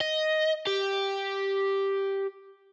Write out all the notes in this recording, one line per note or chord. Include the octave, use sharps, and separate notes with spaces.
D#5
G4